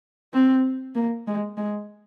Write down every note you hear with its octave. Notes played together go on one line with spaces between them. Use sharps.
C4
A#3
G#3
G#3